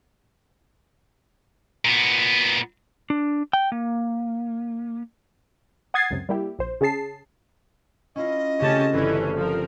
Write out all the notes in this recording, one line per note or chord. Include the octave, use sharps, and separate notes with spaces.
A#2 B3
D4
G5
A#3
F#5 D#6 G#6 A6 C7
C#2 F#2 C3
G3 A#3 E4 G4
A#1 C5
C#3 C#4 G#4 A5 C7
C#4 E4 F4 D#5
C#3 A3 C4 C#4 G4 A5
G1 C3 E3 C#4 A4 D5
F3 A#4